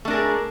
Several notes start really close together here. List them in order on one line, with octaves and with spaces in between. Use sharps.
A3 D4 A#4 G#4